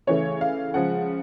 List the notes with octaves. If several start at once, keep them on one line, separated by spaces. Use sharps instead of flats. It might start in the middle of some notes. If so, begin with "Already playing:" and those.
C#3 E3 A3 C#5
F5
C#3 F3 G#3 F#5